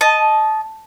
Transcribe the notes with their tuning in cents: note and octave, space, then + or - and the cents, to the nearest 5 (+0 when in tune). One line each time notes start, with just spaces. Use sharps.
D#5 +0 A5 -15